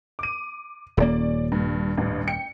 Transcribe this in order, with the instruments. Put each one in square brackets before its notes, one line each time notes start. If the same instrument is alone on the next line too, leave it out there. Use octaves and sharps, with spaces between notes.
[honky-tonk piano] D6 D#7
[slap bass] D#1 A#3 [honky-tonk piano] C#4 D5
[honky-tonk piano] G2
A1 G2
G5 C#7